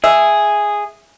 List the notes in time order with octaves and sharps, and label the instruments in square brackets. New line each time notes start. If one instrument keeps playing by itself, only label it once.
[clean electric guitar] G#4 [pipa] E5